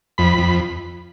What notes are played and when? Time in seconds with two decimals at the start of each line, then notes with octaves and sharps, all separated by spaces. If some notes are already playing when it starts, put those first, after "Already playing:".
0.18 F2 B5
0.38 F2